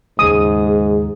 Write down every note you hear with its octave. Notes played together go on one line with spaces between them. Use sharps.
D#2 G#2 C#3 G#3 G#4 D#6